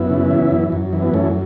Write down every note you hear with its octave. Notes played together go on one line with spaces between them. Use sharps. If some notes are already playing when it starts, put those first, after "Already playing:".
Already playing: F#2 B3 E4
C#3
E3
F#2
F#2
E3
B3
F#2 A3 C#4